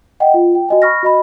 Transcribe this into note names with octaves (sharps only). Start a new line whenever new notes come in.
D#5 F#5 G5
F4
G5
F#4 D#5 G#5
B5 C#6 F6 A#6
F#4 D#5 B5